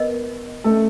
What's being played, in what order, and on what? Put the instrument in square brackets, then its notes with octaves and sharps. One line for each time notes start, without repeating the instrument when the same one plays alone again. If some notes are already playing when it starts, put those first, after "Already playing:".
Already playing: [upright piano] B3 [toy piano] A#4 D#5
[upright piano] A3 A4